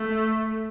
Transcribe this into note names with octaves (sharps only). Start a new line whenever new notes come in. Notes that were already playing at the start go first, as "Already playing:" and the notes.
Already playing: A3